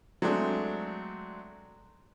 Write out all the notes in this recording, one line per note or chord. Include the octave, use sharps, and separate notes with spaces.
F#3 G#3 A3 C4 D4